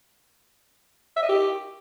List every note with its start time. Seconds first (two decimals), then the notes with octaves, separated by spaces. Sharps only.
1.17 E5
1.23 D#5
1.29 G4